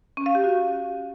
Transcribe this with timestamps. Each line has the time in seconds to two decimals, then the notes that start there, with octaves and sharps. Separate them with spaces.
0.17 C#4
0.26 F5
0.35 G4
0.44 F#4